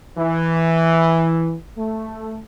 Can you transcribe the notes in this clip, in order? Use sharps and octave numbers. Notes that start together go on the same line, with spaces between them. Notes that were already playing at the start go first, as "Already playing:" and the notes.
E3
A3